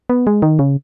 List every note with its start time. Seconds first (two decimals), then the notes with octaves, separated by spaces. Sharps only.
0.09 B3
0.27 G#3
0.42 D#3
0.59 C#3